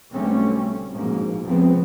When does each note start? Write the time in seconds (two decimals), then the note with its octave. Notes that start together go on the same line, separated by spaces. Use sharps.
0.12 B1 D3 G3 A3 C4 C#4
0.92 A#1 G#2 B2 A#3
1.43 F1 C#2 F3 B3 C4